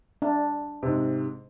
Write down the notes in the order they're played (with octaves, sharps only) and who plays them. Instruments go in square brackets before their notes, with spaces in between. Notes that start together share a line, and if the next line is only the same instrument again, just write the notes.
[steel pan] D4
[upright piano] G#2 C3